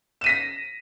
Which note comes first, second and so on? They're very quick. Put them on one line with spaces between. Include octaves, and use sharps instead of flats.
E7 D#7 B6 A#6